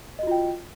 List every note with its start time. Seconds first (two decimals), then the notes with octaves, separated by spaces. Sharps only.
0.19 D#5
0.23 F#4
0.27 F4
0.31 G5